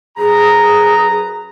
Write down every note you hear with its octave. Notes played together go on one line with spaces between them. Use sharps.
F#2 G#4 B4 A#5